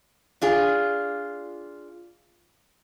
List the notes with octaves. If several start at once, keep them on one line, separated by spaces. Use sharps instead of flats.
D4 F4 G#4